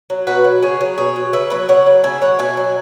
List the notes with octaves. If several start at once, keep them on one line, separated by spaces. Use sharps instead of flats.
F#3
B2 F#4 B4
F#3
C#3 G#4 C#5
F#3
B2 G#4 C#5
F#3
C#3 B4 E5
F#3 B4 E5
C#3 C#5 F#5
F#3
C#3 E5 G#5
F#3 C#5 F#5
B2 E5 G#5
F#3